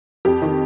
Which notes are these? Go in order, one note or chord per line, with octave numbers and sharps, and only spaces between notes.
F2 G4
D#3